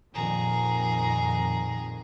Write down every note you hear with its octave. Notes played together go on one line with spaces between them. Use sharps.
F2 A#2 D#3 G#4 A#5